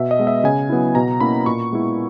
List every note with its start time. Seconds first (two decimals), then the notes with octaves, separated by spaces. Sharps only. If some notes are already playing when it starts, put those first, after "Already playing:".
Already playing: B2 E5
0.11 D#5
0.19 G#3 B3
0.27 E5
0.44 C#3 G#5
0.69 F#3 B3 E4
0.95 B2 A#5
1.20 A#3 C#4 E4 B5
1.46 A#2 C#6
1.72 G#3 B3 E4